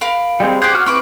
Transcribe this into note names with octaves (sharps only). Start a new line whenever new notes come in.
A#4 F5 B5
G3 G#3 C4
G4 G#4 C5 F#5 D6
F#4 F6
C4 E4 B4 B5 C#6 D6